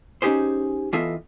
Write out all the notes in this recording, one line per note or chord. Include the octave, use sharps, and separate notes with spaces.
C#4 D#4 G4 G#4 C5
E3 B3 F4 A4 D#5 E5